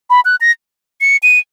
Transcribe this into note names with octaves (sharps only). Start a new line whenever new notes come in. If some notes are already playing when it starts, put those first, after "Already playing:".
B5
F#6
A#6
C#7
D#7